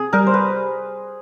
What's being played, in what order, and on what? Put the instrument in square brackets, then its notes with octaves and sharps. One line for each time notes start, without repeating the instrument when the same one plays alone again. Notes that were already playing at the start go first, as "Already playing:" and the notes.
Already playing: [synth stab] C3 [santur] G#4
[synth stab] G3 [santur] A#4
[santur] C5
B4